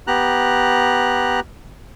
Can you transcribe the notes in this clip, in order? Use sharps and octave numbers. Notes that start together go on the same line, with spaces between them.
B3 G4 A#5 F#6